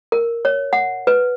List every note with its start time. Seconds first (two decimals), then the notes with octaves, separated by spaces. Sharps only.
0.12 A#4
0.45 C#5
0.73 F#5
1.07 B4